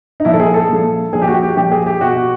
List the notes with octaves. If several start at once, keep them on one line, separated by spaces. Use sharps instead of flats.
D#4
A#2 F3 E4
A4
G#4
A4
A#2 F3
A#2 F3 G#4
G4
F#4
G4
A#2 F3 G4
G#4
G4
B2 F#4